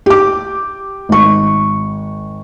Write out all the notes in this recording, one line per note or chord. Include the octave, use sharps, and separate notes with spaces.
G4 D6
G#1 C#6